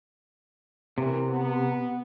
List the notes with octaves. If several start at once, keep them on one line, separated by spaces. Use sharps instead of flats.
C3 E3 A#4
B3